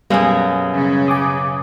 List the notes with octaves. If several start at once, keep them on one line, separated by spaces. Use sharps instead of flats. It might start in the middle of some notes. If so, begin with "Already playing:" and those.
F#2 B2 G3 A#3 G#4
C#3
G#5 D6 D#6